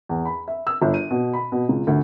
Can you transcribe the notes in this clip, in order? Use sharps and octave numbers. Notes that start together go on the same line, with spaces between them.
E2
B5
E5
E6
G1
D#7
B2
B5
B2
C#2
D2